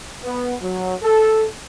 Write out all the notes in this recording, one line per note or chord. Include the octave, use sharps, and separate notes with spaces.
B3
F#3
A4